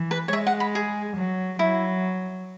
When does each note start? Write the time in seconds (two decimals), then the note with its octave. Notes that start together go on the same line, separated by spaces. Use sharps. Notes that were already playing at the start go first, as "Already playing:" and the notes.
Already playing: E3
0.11 B4
0.28 C#5
0.32 G#3 E5
0.47 F#5
0.60 B5
0.75 G#4
1.17 F#3
1.59 F#3 E4